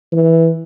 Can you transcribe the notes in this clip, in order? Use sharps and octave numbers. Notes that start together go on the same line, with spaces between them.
E3